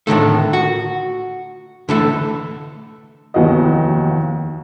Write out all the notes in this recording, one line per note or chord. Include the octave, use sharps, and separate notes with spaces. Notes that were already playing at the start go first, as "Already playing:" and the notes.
A2 D3 D#3 A3
F#4
D3 E3 A3
F1 D#2 E3 B3 F#4 D#5